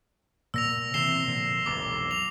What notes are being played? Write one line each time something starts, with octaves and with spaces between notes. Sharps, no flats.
A#2 E6 A#6 F7
C3 E3 C4 C7 E7 G7
A#2 D3 F3
E1 B1 F2 D6
F7